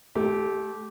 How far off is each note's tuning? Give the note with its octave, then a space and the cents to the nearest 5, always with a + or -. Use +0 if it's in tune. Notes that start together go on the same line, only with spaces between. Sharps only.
A3 -30 G4 -10